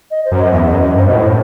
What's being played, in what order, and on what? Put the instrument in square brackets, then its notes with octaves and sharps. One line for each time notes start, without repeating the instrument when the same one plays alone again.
[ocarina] D#5
C5
[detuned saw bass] F#2
[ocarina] D#5
[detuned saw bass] E2 [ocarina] E5
[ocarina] D#5
[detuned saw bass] F#2
[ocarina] D#5
[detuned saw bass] G2 [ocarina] C5
[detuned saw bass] B2 [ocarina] D#5
[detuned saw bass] A2
[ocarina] C5